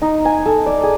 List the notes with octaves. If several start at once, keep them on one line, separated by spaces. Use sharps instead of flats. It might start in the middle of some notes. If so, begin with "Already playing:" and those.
D#4
G#5
A4
D5
G#4